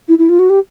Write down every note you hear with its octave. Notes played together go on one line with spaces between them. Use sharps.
E4
E4
F4
F#4
G4